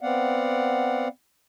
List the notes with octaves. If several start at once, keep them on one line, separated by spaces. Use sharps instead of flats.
B3 C4 D5 F5 F#5